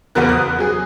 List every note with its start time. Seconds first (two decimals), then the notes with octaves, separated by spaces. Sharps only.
0.15 F#1 E2 B3 F#4 A#4 F#6
0.29 D#6 F#6
0.59 F#3 G#4